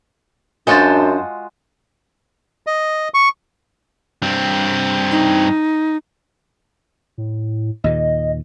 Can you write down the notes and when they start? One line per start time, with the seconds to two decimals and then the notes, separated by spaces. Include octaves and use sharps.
0.67 F#2 G#3 D4 F4 F#4 C5 A5
2.67 D#5
3.14 C#6
4.22 G2 C4
5.11 D#4
7.18 A2
7.84 D#2 A#2 D#3 D#5